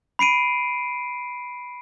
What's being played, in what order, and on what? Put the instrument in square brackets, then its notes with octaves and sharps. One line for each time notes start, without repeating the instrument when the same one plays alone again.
[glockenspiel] B5 C7 D7 D#7